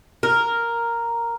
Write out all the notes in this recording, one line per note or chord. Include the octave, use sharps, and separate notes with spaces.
A#4